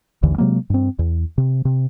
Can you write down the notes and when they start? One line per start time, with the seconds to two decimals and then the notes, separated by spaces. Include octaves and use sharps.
0.23 A1 D#2 D3 E3
0.38 C3 F#3 G#3 A#3
0.70 G2 C4
0.99 E2
1.38 C3
1.65 C3